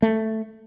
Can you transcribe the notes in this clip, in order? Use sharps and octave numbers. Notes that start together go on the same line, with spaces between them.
A3